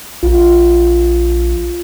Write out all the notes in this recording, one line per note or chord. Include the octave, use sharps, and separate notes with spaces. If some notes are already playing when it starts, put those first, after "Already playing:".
A#1 F4